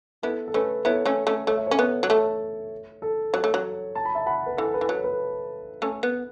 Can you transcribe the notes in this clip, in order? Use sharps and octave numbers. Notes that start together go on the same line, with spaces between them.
B3 E4 A4
A4
A3 C#4 B4
B3 E4 A4 C#5
A3 C#4
A3 C#4
A3 C#5
E5
C#4 A4 C#5
B3
F#3
A3 A4 C#5
A4
F#3 A4 C#5
A3
F#3
A5
B5
E5 A5
F#5 B5
B4
E3 A4
B4
E3
F#3 A4
B4
A3 C#4
B3